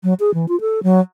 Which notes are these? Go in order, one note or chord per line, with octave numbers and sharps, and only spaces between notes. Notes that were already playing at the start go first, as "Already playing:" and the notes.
F#3
G#4
E3
F4
A4
F#3